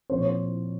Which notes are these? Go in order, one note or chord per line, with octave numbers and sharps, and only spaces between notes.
A#2 F3 C4 C5
C#5
C5